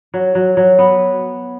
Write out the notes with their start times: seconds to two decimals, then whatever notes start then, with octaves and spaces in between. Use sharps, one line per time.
0.14 F#3
0.35 F#3
0.57 F#3
0.79 B3